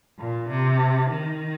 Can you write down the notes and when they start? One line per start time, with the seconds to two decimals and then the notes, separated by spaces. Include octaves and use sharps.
0.19 A#2
0.49 C3
1.10 D#3